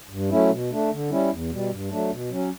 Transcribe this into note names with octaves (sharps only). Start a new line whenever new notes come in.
G2
F#3 A3 C#4 E4
B2
A3 D4
D3
G3 C#4 E4
E2
B2 G3
G2
F#3 A3 D4
B2
F#3 C#4